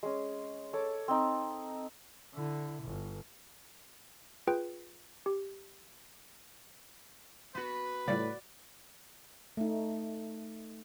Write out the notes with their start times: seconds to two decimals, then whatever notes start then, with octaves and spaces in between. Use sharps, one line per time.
0.03 G#3 C#4
0.73 A4 C#5 D6
1.08 C4 D#4
2.34 D3 E4
2.84 G1
4.47 F4 G#4 B4 G5
5.26 G4
7.55 B3 F#4 B4
8.08 A2 C#3 G3 F4 D5
9.57 A3 D#4